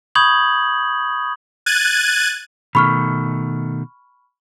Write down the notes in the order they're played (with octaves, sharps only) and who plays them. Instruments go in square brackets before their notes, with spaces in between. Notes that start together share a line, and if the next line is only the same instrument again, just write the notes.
[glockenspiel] B5 C#6 D#6 G6 G#6 F#7
[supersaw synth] F#6 G#6 A6 D#7
[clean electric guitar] B2 D#3 A3 [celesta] B5 C#6 F6